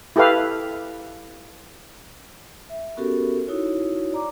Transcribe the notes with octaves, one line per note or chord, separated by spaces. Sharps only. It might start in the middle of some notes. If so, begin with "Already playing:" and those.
E4 G4 A4 B4 F5
E5
B3 C#4 F#4 G4 A4 A#4
D#4 E4 F#4 C#5
D5 A#5 D6